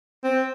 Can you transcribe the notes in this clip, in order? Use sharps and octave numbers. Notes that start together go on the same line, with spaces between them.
C4